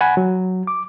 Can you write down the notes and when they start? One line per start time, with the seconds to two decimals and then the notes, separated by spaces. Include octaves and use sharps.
0.01 F#5 G#5 B5
0.17 F#3
0.67 D6